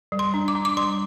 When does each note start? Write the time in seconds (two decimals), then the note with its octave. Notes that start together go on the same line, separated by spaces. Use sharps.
0.12 G3
0.19 C6
0.34 D4
0.48 D6
0.55 D4
0.65 D6
0.77 G3 C6